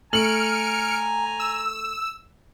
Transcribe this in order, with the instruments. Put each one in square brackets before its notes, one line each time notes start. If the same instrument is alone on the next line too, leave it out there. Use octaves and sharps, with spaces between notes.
[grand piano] A3 F#7 [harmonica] G#5 A#5 [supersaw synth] F6 C#7 D7
[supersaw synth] E6